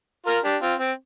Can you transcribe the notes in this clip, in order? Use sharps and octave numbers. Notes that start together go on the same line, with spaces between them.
F4 A#4
D4 G4
C4 F4
C4